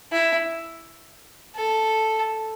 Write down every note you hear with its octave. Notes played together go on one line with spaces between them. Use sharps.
E4
A4